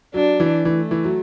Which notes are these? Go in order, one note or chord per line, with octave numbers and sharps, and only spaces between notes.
F#3 D4
E3
E3 A3
E3
F#3